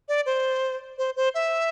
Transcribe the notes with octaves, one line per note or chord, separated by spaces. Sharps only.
D5
C5
C5
C5
E5